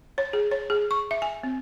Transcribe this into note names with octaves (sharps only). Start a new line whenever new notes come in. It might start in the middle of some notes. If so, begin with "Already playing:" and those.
C#5
G#4
C#5
G#4
C#6
E5
G#5
C4